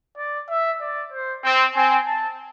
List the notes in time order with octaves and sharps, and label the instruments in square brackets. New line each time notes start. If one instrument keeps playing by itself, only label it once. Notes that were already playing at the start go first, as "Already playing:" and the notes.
[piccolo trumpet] D5
E5
D5
C5
[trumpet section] C4 [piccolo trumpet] C5
[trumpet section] C4 [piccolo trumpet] G#5
[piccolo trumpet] A5